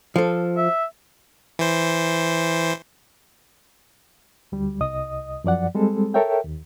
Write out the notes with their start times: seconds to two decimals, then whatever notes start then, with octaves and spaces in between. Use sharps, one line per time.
0.16 F3 A4
0.57 E5
1.59 E3 C5
4.52 D2 G3
4.81 C2 D#5 D#6
5.44 F#2 F3 D5 F#5
5.75 G3 G#3 C4 A4
6.14 A4 A#4 C#5 E5 G5
6.44 D#2